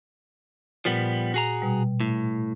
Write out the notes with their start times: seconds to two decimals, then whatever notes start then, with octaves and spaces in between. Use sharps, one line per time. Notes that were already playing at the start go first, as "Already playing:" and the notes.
0.85 A#2 F3 G3 B3
1.34 F#4 G#4 A#5
1.62 B2 G3
2.00 A2